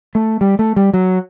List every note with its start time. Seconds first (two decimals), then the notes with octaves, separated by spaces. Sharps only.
0.15 A3
0.41 G3
0.59 A3
0.76 G3
0.94 F#3